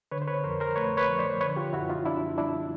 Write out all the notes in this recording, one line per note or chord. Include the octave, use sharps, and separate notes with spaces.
D3 B4 C#5
C5
B4 C#5
F2 A#4 C5
A#4 C5
A3 B4 C#5
B4 C#5
F3
C5 D5
D3 B4 C#5
F4 G4
F#2 E4 F#4
D#4 F4
C4 D4 E4
G3 D4 E4